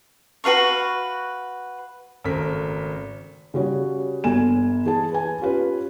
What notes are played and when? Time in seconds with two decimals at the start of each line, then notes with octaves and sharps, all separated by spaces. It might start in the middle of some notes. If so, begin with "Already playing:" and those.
0.44 F#4 B4 F5 C#6
2.24 G#1 C#3 A3 A#4 B6
3.54 C#3 G3 F#4 C#5
4.24 G1 G#5 E7
4.85 E3 G#4 A5
5.11 B4 G#5
5.41 C#4 F4 G4 B4